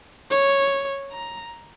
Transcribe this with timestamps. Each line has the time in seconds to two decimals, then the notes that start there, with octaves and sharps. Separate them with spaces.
0.31 C#5
1.12 A#5